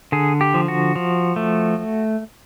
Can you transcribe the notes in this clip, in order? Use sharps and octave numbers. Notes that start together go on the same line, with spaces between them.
D3 G#4
G4
F3
F#4
F3
A3